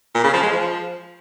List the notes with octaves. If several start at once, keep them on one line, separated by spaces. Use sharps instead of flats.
A#2
C#3
F3
G#3
F3